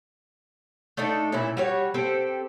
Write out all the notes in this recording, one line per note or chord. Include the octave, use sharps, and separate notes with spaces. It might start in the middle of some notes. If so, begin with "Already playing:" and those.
A3 D4 D#4 A4
A#2 C#4 E4
G3 F#4 C#5
C4 G4 A4